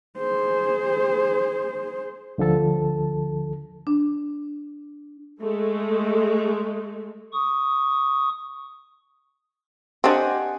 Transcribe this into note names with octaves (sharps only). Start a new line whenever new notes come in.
G#4 C5
D2 D3 F3 A4 A5
D4
G#3 A3
C#6 D#6
C4 D4 G4 C5 D#5 F#5 G#5